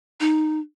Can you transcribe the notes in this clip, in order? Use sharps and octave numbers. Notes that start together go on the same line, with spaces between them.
D#4